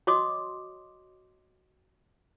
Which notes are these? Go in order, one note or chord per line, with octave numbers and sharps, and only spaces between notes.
F#4 C#5 D#5 C6 D6 D#6